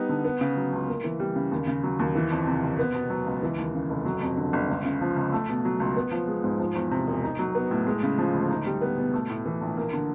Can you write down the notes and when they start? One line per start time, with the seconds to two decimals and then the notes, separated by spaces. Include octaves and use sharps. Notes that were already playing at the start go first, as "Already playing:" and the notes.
Already playing: G3 B3 D#4
0.09 D3
0.25 B3
0.41 C#3
0.57 F#3
0.73 C#2
0.88 A#3
1.04 E3
1.20 G3
1.36 C#3
1.52 D#2
1.67 C#3
1.83 F#3
1.99 D#2
2.15 E3
2.31 F2
2.47 C3
2.63 F#1
2.79 B3
2.94 B2
3.10 F#3
3.26 C#2
3.43 E3
3.58 D#2
3.74 C#3
3.90 F1
4.05 F#3
4.22 F2
4.37 D3
4.53 G1
4.69 C#2
4.85 C#3
5.01 F3
5.16 C#2
5.32 A3
5.49 B2
5.65 F#3
5.80 C#2
5.97 B3
6.12 F3
6.27 G#3
6.44 G#2
6.60 F3
6.75 E2
6.91 C3
7.07 E1
7.23 D#4
7.39 F#3
7.55 B3
7.71 A2
7.87 G#3
8.03 C#3
8.18 F3
8.34 D2
8.50 D#4
8.66 G3
8.81 B3
8.97 B2
9.14 A3
9.30 A2
9.46 E3
9.61 A#1
9.77 A#3
9.93 D3